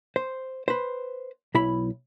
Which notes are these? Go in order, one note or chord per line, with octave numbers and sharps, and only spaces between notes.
C5
B4 C5
B1 E4 B5